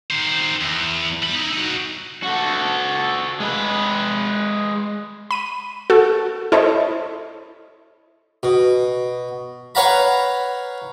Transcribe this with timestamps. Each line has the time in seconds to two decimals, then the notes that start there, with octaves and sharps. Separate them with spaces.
0.10 D#3 C5
0.61 E2
1.23 G3 B5
1.35 D#4 E4
1.53 D#4 F#4
2.23 F#4 A4
3.40 G#3 B4
5.31 B5 D#7
5.90 F#4 A4
6.52 E4 A4 C5 C#5 D#5
8.43 B2
9.75 B4 C#5 F5 F#5 A#5 B5